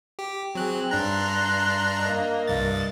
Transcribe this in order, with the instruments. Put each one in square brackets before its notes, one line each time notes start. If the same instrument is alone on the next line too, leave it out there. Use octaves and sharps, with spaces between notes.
[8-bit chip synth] G4
[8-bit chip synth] F#3 F#6 [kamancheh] C4 G#4
[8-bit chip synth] G2 D4 A#5 [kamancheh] C6 F#6
[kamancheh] A#3 D#5
[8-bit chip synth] C2 G2 A6